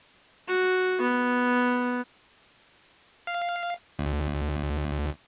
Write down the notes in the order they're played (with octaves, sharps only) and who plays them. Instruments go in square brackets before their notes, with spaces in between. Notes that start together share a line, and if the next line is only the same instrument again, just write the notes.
[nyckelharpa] F#4
B3
[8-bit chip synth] F5
D2